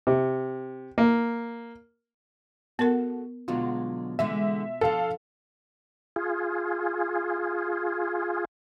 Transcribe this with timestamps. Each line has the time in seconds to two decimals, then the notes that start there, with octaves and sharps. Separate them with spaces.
0.07 C3
0.98 A#3
2.79 B3 F#4 A4 A#4
3.48 B2 D3 F#3 G#3 F4
4.19 D3 E3 G#3 E5
4.81 F3 D4 A4 F5
6.16 F4 G#4